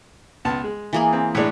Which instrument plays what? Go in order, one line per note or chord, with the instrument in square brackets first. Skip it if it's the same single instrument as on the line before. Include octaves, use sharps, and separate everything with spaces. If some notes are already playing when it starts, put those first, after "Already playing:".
[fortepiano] C#2 B3 A5
G#3
[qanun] E3 A#3 G#4
[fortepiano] C4
[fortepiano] A2 G#3 D4 [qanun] B4 C#5